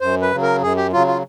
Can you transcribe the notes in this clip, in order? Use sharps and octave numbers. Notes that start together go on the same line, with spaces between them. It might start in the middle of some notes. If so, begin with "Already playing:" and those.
F#2 C5
B4
C#3 F#3
A#4
F#2 G#4
G4
C#3 F#3 F4
F4